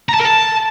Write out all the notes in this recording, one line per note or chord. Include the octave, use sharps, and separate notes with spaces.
A#5
A5
A#4
A5